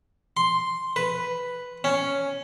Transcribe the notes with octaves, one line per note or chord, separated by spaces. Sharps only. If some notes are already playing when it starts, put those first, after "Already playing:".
C6
B4
C#4